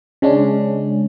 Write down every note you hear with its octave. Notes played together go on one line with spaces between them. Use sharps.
C#3 G#3 C#4 D4